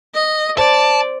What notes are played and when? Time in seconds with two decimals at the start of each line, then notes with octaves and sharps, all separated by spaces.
0.15 D#5
0.58 C5 D5 A5